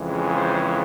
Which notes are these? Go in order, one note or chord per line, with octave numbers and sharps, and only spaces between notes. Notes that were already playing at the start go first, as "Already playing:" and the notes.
Already playing: F2 C#3 E3 G#3
G#4 C5